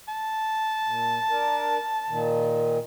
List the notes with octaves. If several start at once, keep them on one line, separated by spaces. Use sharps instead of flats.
A5
A#2
D4 A#4
A#2 D#3